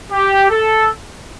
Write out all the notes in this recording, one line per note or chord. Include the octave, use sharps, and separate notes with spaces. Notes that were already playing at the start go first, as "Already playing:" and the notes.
G4
A4